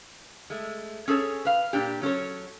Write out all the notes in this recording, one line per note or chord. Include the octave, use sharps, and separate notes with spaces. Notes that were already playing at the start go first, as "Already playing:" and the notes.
G#3 A3
C#4 G#4 A4 C5 C#5
B4 F5
A#2 D4 G4
F#3 C#4 A4 C#5